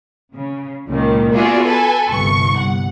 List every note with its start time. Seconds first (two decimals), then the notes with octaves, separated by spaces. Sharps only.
0.34 C#3
0.88 C#2 A#2 D#3
1.33 B3 F4 F#4 G#4 D5 E5
1.66 A4 B4 G#5
2.10 G1 C2 C#6
2.57 G1 F#5